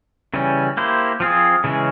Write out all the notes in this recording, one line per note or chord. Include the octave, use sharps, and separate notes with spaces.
C#3 E3 G3 C#4
A#3 E4 G4 C5
F3 C4 F4 G#4
C#3 E3 G#3 C#4